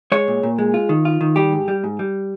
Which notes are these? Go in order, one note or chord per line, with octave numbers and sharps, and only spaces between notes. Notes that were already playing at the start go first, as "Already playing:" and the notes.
G#3 C#5
A#2
A#2
G#3
F4
D#3
F4
D#3
G3 G4
G#2
G3
G#2
G3